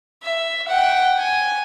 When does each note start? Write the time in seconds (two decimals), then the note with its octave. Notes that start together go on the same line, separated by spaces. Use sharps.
0.23 E5
0.68 F#5 G5
1.18 G#5